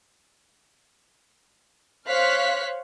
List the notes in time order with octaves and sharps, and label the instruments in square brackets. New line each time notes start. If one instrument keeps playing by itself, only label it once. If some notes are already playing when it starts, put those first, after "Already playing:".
[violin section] C5 C#5 F5 F6 F#6 B6